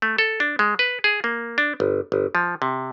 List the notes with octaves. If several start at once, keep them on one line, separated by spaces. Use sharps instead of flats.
A3
A4
D4
G#3
B4
G#4
A#3
D4
G1
G1
F3
C3